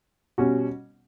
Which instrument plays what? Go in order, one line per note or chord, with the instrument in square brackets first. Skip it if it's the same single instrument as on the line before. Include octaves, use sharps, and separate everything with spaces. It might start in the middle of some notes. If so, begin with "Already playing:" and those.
[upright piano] B2 G3 C#4 F#4